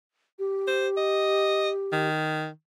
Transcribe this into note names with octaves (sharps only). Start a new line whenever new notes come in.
G4
C5
D#5
D#3